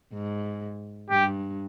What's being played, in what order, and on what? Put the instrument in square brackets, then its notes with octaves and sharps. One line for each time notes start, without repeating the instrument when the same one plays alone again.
[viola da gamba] G#2
[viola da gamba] G2 [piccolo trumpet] G4